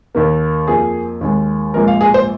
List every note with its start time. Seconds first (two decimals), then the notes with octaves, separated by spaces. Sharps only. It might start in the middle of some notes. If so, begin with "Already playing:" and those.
0.15 D#2 D#3 A#3
0.68 F2 F3 A#3 G#4
1.21 D#2 D#3 G#3
1.74 A#1 A#2 G#3 A#4
1.88 F5
2.01 G#4
2.14 C5